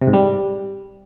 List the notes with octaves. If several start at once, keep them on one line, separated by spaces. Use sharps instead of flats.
C3
G#2
G3